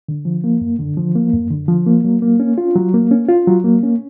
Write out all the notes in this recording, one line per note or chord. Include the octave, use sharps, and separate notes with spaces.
D3
F3
A#3
F#2
D3
F3
A#3
F#2
D3
F3
A#3
F#3
A#3
C#4
F4
F#3
A#3
C#4
F4
F#3
A#3
C#4